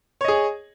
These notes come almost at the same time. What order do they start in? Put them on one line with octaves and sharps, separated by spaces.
C#5 D#5 G#4